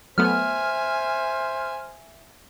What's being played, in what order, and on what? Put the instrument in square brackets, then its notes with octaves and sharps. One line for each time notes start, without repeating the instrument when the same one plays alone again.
[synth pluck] F#3 A3 B3 [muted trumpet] C5 [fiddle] E5 G#5 [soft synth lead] F6